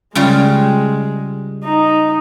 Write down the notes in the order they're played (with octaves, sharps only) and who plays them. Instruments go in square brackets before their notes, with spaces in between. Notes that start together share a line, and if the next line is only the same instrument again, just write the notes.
[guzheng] C#3 G3 F4 [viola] G#3
[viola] D#4